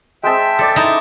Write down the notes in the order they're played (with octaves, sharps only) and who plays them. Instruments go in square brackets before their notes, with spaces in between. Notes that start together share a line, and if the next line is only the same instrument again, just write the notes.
[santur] G#3 C4 A5 [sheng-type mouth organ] E5 G5
[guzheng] A4 [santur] D5 E6
[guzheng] D#4 E4